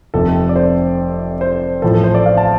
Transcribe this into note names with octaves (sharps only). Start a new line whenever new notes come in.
F1 F2 C3 A4
D5
C5
C5
A1 A2 F3 A4
A4
C5
D5
F5
A5